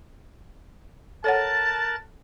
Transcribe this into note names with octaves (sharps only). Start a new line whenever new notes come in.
A4 A#4 C#5 F#5 A5 F#6 A6